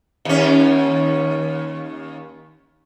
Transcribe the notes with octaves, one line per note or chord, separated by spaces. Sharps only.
D#2 C#4